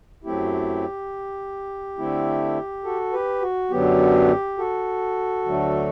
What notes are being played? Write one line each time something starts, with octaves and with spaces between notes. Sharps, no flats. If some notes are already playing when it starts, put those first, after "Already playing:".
F#2 F#3 A3 C4 E4 G4
D3 A3 C4 E4
F#4 A4
G4 B4
F#4
F#2 D3 F#3 B3 G4
F#4 A4
D2 D3 F#3 A3